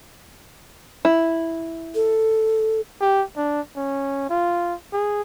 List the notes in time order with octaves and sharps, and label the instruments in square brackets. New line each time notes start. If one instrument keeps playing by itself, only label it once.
[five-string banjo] E4
[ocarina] A4
[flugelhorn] G4
D4
C#4
F4
G#4